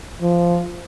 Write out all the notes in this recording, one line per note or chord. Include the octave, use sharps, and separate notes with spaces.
F3